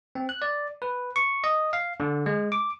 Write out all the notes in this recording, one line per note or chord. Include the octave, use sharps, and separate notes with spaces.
C4
F#6
D5
B4
C#6
D#5
F5
D3
G#3
D6